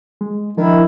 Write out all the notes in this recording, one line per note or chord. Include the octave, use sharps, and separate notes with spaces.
G#3
D#3 F3 D4 E4